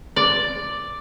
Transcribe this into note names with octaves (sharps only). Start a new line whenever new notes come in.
D5